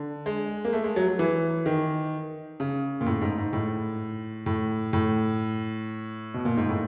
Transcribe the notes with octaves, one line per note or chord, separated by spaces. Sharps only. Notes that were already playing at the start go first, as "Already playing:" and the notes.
Already playing: D3
G#3
A#3
A3
G#3
F#3
F#3
E3
D#3
C#3
A#2
A2
G#2
G#2
A2
A2
A2
B2
A#2
G#2
A2